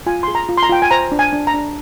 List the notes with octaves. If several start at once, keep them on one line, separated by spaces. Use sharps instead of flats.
F4 G#5
G#4 C6
A#5
F4
C6
A#5
F4 G5
G#5
C5 A#5
D4
G#5
D4
A#5
D4